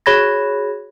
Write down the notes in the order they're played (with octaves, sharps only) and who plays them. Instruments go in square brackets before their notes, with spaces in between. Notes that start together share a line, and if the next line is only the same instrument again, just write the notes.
[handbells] F#4 G#4 C#5 B5 G#6 A#6